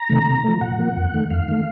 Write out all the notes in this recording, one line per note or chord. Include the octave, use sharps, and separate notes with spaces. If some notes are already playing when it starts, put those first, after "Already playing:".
Already playing: A#5
C3 D#3 A3
C3
F3 A3
A#2 F#5
F3 A#3
F2
D#3 A3
F2 F5
D#3 A3